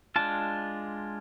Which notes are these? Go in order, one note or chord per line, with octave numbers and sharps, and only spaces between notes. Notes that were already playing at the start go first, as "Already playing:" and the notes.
G#3 D4 F4 A5